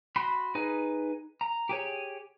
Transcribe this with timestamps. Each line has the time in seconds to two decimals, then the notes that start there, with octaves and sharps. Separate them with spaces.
0.16 F#4 B5 C6
0.55 D#4 G#4 B4
1.41 A#5
1.69 G4 G#4 C#5